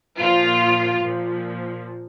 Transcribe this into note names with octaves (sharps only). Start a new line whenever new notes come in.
A#2 F3 F4
A#2 F3